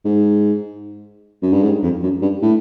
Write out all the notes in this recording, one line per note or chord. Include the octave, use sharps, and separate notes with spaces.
G#2
F#2
G2
G#2
F2
F#2
G2
A2